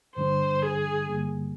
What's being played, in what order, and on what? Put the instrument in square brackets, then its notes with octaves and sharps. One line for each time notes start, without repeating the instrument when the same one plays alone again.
[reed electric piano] G2 D3 G3 D4 [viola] C5
[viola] G#4
[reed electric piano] G2 D3 G3 A#3